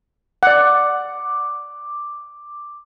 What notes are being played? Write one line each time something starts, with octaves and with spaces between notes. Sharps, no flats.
D5 F#5 D6